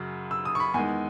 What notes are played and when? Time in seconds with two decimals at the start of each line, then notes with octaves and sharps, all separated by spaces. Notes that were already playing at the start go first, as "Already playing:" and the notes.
Already playing: F#2 C#3 F#3
0.31 E6
0.45 D#6
0.55 C#6
0.60 B5
0.74 E2 D#3 G#3 G#5